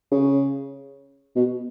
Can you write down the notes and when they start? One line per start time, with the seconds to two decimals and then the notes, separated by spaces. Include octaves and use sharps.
0.12 C#3
1.36 B2